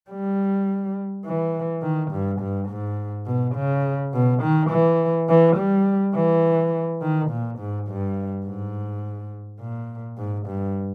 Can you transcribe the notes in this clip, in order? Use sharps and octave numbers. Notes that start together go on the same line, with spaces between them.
G3
E3
D#3
G2
G2
G#2
B2
C#3
B2
D#3
E3
E3
G3
E3
D#3
A#2
G#2
G2
G#2
A#2
G#2
G2